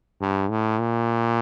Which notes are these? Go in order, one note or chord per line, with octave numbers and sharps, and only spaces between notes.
G2
A2
A#2